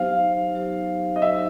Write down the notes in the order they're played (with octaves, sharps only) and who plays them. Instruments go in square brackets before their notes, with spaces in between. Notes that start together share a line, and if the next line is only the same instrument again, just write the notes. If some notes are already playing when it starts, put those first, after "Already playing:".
Already playing: [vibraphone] F#3 B3 D#4 G4 C5 [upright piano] F5
[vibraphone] F#3 B3 D#4 G4 C5
[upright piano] D#5
[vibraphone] F#3 B3 D#4 G4 C5 [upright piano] E5